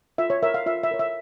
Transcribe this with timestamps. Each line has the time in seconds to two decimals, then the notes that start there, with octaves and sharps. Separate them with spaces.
0.18 F4 E5
0.30 C#5
0.42 A#4 C#5 E5
0.54 F5
0.66 F4 E5
0.83 E5
0.91 A#4 C#5
0.99 E5